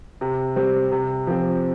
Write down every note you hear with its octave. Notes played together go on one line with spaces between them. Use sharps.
C3
G3 C4
C3
F3 C4